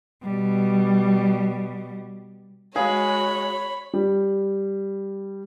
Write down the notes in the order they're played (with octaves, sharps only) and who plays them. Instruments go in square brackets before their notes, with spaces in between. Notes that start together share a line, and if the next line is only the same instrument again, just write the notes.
[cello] B2 G3
[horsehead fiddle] G#3 F#4 [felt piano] G#4 F5 [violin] C#5 [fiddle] B5
[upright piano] G3